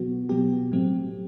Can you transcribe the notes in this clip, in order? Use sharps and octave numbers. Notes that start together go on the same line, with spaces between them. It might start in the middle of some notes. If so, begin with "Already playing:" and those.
Already playing: B2 F#3 B3 F#4
B2 F#3 B3 G4
A2 F#3 A3 C4